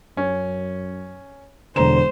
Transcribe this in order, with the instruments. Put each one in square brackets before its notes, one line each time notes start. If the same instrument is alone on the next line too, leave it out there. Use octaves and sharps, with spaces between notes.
[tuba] F#2 [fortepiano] C#4
[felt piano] E1 A#5 E7 [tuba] D3 [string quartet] C5